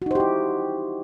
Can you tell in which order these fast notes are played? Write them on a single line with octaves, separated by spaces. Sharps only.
F#4 D#4 C5 G4 E4